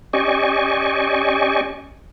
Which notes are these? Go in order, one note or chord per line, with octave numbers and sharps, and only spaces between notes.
C#4 G4 D5 D#5 G#5 C#6